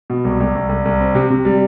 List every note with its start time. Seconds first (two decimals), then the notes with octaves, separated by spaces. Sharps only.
0.10 B2
0.25 C2
0.40 C2
0.55 C2
0.69 C2
0.85 C2
1.00 C4
1.15 C3
1.30 C3
1.45 G3